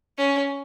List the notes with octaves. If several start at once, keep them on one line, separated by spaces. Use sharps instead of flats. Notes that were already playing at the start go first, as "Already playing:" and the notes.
C#4